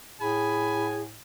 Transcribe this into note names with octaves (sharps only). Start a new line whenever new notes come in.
A2 G#4 G#5 B5